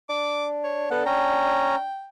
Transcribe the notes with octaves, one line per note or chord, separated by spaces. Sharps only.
D4 D6
C#5
B3 A4 F#5
C#4 G5 A#5